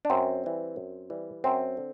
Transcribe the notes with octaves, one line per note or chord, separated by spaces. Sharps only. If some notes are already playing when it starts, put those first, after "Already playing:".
D4
F#2 C4
E3 G3
F#2
E3 G3
F#2 C4
D3